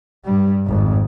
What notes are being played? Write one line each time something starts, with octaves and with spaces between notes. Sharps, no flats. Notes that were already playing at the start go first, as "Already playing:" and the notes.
G2 G3
G#1 F2